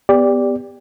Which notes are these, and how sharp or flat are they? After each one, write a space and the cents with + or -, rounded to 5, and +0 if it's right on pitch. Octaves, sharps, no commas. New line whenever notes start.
B3 +10 G4 +25 D5 -10